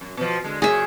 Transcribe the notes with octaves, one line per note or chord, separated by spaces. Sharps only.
F#2
B2 F3
D3 G#3
F#2 A#2 C#3 G#4 E5